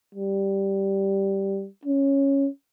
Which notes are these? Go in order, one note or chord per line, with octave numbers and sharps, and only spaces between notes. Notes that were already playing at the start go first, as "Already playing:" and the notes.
G3
C#4